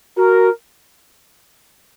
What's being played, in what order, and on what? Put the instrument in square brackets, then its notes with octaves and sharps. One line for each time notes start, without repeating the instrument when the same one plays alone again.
[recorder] F#4 [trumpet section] A#4